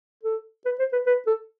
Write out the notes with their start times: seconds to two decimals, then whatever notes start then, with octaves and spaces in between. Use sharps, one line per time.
0.23 A4
0.65 B4
0.79 C5
0.93 B4
1.07 B4
1.27 A4